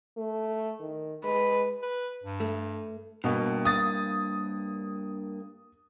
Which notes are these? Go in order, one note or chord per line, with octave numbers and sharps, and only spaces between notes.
A3
D#3
G#3 B4
B4
G2
A3
G2 B2 A#3
D#6 A6